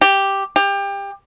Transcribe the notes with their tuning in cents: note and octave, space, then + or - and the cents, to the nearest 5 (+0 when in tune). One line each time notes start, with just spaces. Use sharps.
G4 +0
G4 +25